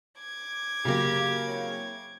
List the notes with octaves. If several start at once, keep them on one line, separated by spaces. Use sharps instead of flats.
D6 G#6
F#2 C#3 F#3 A#3 F4 G4
C4 E4 C#5